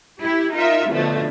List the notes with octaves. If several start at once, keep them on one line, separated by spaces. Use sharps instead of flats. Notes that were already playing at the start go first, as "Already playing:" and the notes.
E4 G4
D#4 F4 A#4 E5
B2 D3 F3 A3